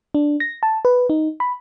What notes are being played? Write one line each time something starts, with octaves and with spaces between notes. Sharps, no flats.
D4
A#6
A5
B4
D#4
B5